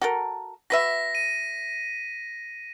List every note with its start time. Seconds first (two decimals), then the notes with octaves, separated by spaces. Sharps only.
0.01 F#4 A4 A#4
0.70 F#4 B4 E5 A#6 B6
1.15 D#7